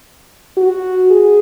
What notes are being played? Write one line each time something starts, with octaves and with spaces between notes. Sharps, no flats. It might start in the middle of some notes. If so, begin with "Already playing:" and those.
F#4
G#4